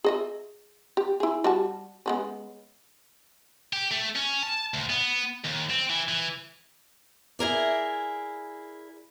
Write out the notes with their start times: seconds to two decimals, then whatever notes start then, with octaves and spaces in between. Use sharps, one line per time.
0.04 G#4 D#5 E5
0.97 G4
1.20 E4 G#4
1.44 G3 F#4 A5
2.06 G#3 B3 C#4
3.73 G4
3.91 A3
4.15 C#4
4.43 A5
4.74 D2
4.90 B3
5.44 D#2
5.70 C4
5.90 E3
6.08 E3
7.39 E4 G#4 A#4 D5